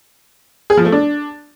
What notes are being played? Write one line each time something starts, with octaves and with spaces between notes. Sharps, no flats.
G#4
F3
A3
D4